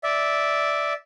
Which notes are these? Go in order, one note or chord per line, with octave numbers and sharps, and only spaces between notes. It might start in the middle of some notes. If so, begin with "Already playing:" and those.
D5 E5